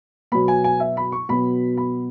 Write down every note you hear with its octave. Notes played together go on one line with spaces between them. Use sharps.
B2 F#3 B3 B5
G#5
G#5
E5
B5
C#6
B2 F#3 B3 B5
B5